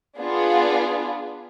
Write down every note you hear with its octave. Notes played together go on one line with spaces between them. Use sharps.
B3 D4 F4 G#4